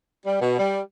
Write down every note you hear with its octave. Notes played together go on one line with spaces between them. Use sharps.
G3
B2
G3